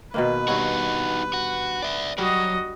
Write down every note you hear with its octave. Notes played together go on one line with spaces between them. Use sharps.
B2 D#3 A#3 B4
G2 D#4 F#4 C#5
F#4
D5 E5
F#3 G3 F#4 D#5